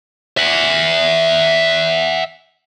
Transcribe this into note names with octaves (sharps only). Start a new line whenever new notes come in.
E5 F#5